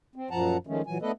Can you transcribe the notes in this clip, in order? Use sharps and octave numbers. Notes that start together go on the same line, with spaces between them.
C4
F#2 A#2 F3 F#5 A5 A#5
D#3 F3 G#3 A3 C#4
A#2 E3 F#3 G#5
A3 B3 D4 A4 B4 D#5